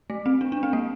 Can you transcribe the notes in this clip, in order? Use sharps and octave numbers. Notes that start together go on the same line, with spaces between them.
A3
C4
D4
D4
C4
A#3